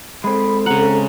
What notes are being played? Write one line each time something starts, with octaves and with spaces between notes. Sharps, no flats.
G#3 C4 A4 B5
C#3 F#5 A#5